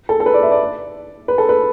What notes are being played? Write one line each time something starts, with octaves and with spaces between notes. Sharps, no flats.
A4
A4
B4
D5
E5
D5
B4
A4
B4